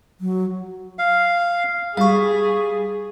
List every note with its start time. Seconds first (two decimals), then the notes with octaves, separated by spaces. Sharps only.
0.20 F#3
0.99 F5
1.97 G3 G#4 F5 C#6